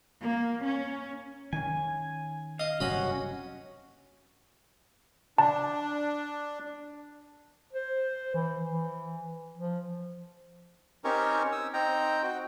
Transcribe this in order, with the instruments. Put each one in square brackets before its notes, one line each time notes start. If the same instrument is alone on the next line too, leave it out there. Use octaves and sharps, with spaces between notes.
[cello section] A#3
C#4
[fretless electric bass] D#3 C#4 [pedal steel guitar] G#5
[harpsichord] D#5 [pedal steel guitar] F5
[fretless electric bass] F#1 G2 C3 [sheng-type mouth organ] C#4 F#4 [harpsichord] D#5 B5
[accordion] D4 [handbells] A5
[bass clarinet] C5
E3
E3
F3
[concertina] C4 C#4 D#4 G4 A#4 C#5
D#6 E6
C4 D#4 G5 A#5
F#4 G5